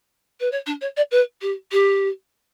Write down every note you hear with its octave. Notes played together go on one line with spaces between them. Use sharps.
B4
C#5
D4
C#5
D5
B4
G4
G4